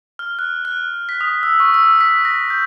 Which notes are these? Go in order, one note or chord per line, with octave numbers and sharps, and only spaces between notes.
F6
F#6
F#6
B6
D#6
E6
C#6
E6
B6
A#6
G6